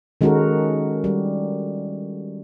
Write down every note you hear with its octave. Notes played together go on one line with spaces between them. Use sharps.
D#3 G#3 C#4 F#4 A4 A#4
G3